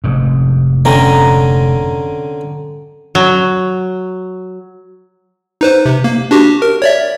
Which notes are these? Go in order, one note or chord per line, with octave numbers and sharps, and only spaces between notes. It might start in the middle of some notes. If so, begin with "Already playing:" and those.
F1 G#2
D3 C4 C#4 A#5
F#3
D#4 B4 C5
C3
A#3
D4 F#4 G4
A#4
C#5 D5 E5